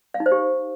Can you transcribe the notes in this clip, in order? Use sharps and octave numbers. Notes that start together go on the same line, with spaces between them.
F5
D#4
C5
G4